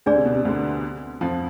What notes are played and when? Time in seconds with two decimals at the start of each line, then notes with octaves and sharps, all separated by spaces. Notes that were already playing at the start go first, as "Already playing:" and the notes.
0.06 D2 D3 D4 G#4 D5
0.16 C3
0.25 B2
0.35 C3
0.45 D2 D3
1.21 F2 F3